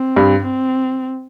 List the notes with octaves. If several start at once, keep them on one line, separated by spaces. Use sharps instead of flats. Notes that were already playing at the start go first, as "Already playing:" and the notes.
Already playing: C4
G2
C4